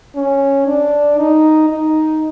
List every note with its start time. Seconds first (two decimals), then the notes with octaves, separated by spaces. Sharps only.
0.16 C#4
0.67 D4
1.18 D#4
1.70 D#4